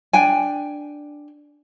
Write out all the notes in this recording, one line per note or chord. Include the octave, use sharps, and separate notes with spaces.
D4 G5 G#5